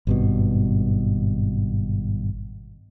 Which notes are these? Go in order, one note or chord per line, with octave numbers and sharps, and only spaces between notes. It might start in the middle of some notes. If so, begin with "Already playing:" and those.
G#1 G2 B2